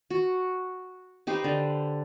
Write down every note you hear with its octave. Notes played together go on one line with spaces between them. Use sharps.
F#4
D#4 G4 B4 C5
D3